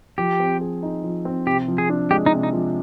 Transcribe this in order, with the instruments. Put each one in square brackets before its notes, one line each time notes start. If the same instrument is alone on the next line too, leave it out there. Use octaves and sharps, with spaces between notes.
[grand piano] F3 [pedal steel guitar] G4
[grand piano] C4
G#4
D#4
F3
C4
[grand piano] C3 [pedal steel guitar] G4
[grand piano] F3
[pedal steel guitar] G#4
[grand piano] D4
[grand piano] G#3 [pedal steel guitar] G4
[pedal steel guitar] D#4
[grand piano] C3
[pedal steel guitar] D#4
[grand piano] F3